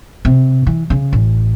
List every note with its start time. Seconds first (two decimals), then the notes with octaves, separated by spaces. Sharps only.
0.25 C3
0.67 E3
0.90 C#3
1.13 A1